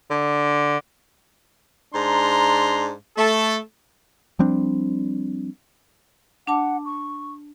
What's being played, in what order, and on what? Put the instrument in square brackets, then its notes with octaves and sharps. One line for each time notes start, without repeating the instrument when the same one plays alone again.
[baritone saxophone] D3
[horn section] G#2 D4 A#5 C6
A3 A4
[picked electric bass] F3 G3 C4 D4
[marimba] D4 A5 D6 [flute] F#5
[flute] C#6